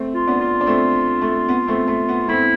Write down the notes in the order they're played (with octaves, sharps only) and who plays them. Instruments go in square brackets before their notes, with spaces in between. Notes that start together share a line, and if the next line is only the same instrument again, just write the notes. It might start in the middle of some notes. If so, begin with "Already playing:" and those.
Already playing: [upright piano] A3 C4
[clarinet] F4
[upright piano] B3 D4
[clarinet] F4
[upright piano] D4
A3 C4
A3
B3
A3 C4
A3
B3
[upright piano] A3 C4 [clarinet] E4